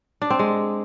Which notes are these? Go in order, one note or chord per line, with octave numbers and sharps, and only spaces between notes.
D4
C4
G#3